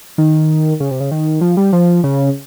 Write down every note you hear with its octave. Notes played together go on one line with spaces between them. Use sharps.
D#3
C#3
C3
C#3
D#3
F3
G3
F3
C#3